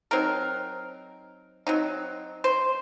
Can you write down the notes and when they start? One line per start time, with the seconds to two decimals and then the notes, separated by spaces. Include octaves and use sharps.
0.11 F#3 C4 D#4 A#4
1.67 F#3 C4 D#4
2.44 C5